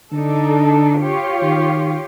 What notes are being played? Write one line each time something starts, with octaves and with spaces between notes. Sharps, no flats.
D3 D4 D#4 A4
F4 G4 C#5
D#3